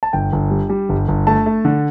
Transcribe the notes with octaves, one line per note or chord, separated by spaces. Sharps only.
A5
G1 G5
G1
G3
G3
G1
G1
A3 A5
A3
D3